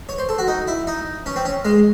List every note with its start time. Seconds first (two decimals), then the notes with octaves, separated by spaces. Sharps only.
0.09 C#5
0.19 C5
0.29 A4
0.39 F#4
0.48 D#4
0.67 E4
0.87 D#4
1.26 C#4
1.36 C4
1.45 C#4
1.65 G#3